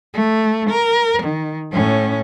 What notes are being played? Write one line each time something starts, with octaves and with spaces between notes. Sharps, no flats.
A3
A#4
D#3
A2 C#4